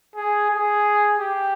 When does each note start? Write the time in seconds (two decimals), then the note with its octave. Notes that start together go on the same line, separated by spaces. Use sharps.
0.16 G#4
0.50 G#4
1.19 G4